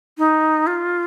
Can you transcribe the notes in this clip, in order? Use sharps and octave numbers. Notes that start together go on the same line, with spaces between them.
D#4
F4